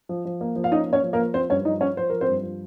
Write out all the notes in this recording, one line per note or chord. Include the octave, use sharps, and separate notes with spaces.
F3
F3
A#3
F3
F5
C#4 D#4 D#5
A#3
C#4 C#5
F3
A#3 A#4
F3
F3 C4 C5
G2 C#4 C#5
F3 D#4 D#5
C#4 C#5
F3 C5
F3 A#4
C4 C5
G2
F3